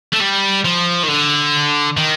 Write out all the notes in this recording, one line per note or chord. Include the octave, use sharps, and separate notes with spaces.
A3
G3
F3
D#3
D3
D#3